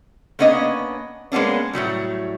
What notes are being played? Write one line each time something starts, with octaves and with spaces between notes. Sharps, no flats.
A#3 B3 C#4 D4 D#5
G#3 A#3 B3 C#4 D4
A2 C3 F#3 G3